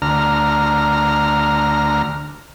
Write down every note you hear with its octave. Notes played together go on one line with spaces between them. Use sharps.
D2 A#5 F6